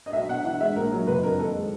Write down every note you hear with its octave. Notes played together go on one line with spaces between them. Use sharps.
D#5
B1 E5
B2 F#5
E3 F#5
G#3 E5
A#1 A#4
F#3 A#4
F#1 B4
F2 A#4
D#3 A4
G#3